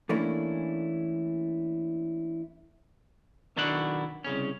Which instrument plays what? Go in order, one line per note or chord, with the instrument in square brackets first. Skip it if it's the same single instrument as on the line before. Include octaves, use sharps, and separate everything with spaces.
[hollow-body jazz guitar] E3 A3 A#3 C#4 D4 E4
[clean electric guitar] B1 D#3 D4 E4 F#4 F#5
C2 C#3 C#4